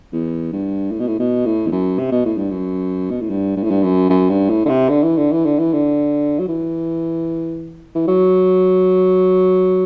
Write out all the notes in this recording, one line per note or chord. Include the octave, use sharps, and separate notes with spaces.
E2
G2
A2
B2
A2
B2
A2
E2
F#2
C3
B2
A2
G2
F#2
B2
A2
G2
G2
A2
G2
F#2
F#2
G2
A2
D3
C3
D3
E3
D3
E3
D3
E3
D3
F#3
E3
E3
F#3